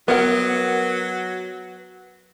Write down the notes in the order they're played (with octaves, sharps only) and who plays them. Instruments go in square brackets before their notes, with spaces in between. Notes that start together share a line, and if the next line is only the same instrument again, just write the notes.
[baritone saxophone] F#3 [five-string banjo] B3 A#4 F#5